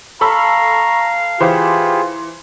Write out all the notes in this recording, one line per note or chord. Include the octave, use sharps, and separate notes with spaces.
A4 F5 A#5 B5 C#6 E6
E3 F4 G4 G#4 C5 B5